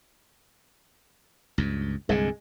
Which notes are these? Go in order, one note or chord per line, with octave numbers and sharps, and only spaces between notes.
C#2 G2
C2 G2 D3 G#3